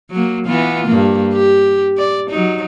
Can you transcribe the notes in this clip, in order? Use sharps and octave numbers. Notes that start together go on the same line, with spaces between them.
F#3 A#3
E3 B3 F4
G2 A#3
G4
D5
F#3 D#4